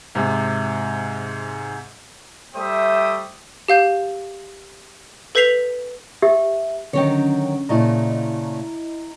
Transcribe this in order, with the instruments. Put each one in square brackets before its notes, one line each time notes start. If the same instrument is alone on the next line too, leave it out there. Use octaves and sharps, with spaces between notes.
[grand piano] G#2 C3
[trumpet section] G3 A3 C5 E5 G5 D#6
[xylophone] G4 F5 G6
A4 B4 G6 B6 C7 F7
[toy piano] G4 [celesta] E5
[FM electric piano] D3 C#4 G5 [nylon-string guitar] D#3 F#3 C#5
[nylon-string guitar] A#2 C#3 A3 [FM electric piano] E4 D#5 A#5